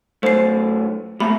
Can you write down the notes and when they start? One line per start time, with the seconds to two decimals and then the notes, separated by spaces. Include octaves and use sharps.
0.23 F#2 A3 C5 C7
1.20 G3 A3 A#3 B5